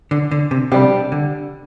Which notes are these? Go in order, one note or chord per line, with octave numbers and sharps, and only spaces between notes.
D3
D3
C3
C3 G3 D4 G4
D3